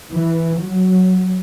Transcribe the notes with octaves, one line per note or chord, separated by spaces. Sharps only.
E3
F#3